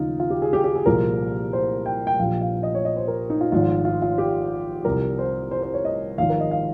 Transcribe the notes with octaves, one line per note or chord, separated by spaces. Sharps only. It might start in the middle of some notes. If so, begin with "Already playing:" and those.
Already playing: D#2 C#3 F3 D#4 F4
F4
G4
G#4
G4
G4
G#4
C2 A#2 F3 A#4
C5
G5
G5
A#1 A#2 F3 F5
F5
D#5
C#5
D#5
C5
A#4
D#4
F4
G#1 G#2 F3 F4
F4
F4
G4
C2 C3 F3 A#4
C5
C5
C5
C#5
D#5
G#1 G#2 F3 F5
A#4
D#5
F5